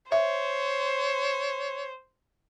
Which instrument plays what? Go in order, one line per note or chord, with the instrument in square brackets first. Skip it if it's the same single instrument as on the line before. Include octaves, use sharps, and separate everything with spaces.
[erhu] C5 [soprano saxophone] C#5 [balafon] E5